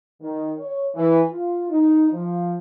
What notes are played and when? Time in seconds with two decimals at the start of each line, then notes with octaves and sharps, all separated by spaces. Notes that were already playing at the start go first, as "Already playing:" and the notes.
0.22 D#3
0.58 C#5
0.95 E3
1.29 F4
1.70 D#4
2.12 F3